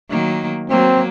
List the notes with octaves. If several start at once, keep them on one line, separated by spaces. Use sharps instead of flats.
D#3 F#3 A#3
F#3 A#3 C4